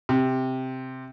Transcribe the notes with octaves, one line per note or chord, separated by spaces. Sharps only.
C3